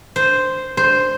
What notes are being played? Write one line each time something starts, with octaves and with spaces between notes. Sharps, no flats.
C5
C5